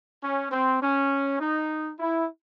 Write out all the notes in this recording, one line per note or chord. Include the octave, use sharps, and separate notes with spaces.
C#4
C4
C#4
D#4
E4